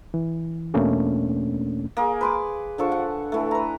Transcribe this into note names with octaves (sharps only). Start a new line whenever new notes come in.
E3
E2 B2 A3 A#3 C#4 D4
A#3 G#4
B4 C6 D6
D3 F3 A4 C#6
F#5
E3 A3
B4 A#5